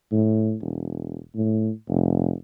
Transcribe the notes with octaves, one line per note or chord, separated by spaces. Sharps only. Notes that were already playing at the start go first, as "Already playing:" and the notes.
A2
E1
A2
F1